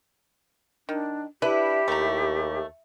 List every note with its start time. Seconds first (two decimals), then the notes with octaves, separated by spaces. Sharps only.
0.89 D#3 D4
1.42 D4 E4 G4 B4
1.88 D#2 A3 A#5